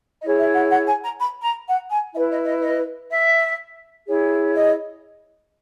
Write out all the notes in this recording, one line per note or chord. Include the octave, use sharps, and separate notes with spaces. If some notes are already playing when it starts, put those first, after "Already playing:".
E4 G#4 C#5 D#5
E5
F#5
F#5
G#5
A#5
B5
A#5
F#5
G#5
E4 B4 E5
D#5
D#5
D#5
E5
E4 G#4 C#5
D#5